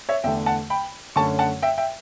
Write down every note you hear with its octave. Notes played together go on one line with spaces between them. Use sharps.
C#5 E5
E2 D3 A3 E5 G5
F#5 A5
G5 B5
F#2 D3 A3 C#4 A5 C#6
F#5 A5
E5 G5
E5 G5